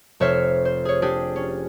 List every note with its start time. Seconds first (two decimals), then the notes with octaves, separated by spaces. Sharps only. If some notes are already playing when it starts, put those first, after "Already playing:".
0.20 F1 C5 C#5 E5 F6 C7
0.65 C5
0.85 G#4 C#5
1.02 D4 G4 G#4
1.36 C#4